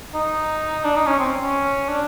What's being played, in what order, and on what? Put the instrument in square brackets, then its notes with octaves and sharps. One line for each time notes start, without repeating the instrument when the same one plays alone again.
[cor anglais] D#4
D4
D#4
C#4
C4
C#4
D4